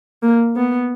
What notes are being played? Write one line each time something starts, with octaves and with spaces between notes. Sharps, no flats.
A#3
B3